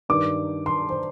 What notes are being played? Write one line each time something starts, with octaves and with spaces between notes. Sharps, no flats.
G2 D#3 D6
C6
C5